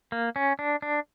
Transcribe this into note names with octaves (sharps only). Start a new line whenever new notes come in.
A#3
C#4
D4
D4